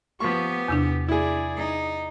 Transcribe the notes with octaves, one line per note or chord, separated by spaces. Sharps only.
F3 B3 G4 C#6
E2 C3 D4
E4 G#4 D5
D#4